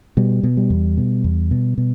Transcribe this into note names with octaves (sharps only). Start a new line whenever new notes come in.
B2 G3
B2
G3
E2
B2
E2
B2
B2